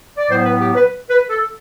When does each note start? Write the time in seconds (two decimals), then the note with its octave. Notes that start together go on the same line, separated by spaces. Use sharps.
0.18 D5
0.30 A2 F#3 B3 C5
0.44 B4
0.60 G4
0.75 B4
1.10 B4
1.30 A4